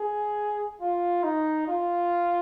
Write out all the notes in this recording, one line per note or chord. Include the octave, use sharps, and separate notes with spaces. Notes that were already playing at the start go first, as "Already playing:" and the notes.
Already playing: G#4
F4
D#4
F4